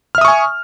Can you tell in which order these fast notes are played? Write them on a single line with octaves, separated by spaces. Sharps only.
F6 E5 D#6 C#6 G#5